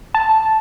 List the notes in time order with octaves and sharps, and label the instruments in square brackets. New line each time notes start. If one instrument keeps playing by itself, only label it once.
[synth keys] A5